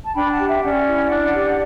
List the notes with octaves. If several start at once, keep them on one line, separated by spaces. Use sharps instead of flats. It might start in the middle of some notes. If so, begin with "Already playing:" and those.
A5
D4 G5 B5
F#5 A5
G4
E5 G5
C#4 D5 F#5
E4
D4
G4